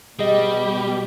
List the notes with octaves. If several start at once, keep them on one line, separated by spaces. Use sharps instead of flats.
B2 G3 G4 G#4 D#5